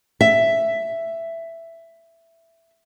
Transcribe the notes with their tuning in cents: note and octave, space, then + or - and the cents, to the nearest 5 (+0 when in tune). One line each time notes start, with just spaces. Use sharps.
E5 +10